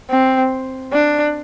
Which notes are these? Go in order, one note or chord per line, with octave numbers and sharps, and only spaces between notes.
C4
D4